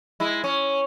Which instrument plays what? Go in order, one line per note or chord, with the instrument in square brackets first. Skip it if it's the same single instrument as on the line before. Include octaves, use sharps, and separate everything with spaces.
[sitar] G#3 E4
C#4